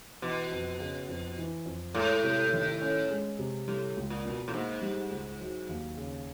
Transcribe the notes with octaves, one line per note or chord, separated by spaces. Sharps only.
B2 E3
F2
C#3
F2
E3
F2
A2 G#3
C3
D#3
C#4
G#3
C3
A2 G3
C#2
A#2
B2
A2
G#2 A#3
G3
C#2
F#3
D#2
C#3